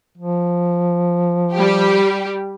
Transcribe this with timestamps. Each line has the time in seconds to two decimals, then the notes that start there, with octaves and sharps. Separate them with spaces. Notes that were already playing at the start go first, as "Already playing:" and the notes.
0.18 F3
1.53 G3 G4